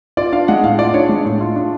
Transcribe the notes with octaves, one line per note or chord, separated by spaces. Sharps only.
F4 D5
D4 F5
G#3 F#5
A2 F5
F4 D5
D4 C#5
G#3
A2
F4
D4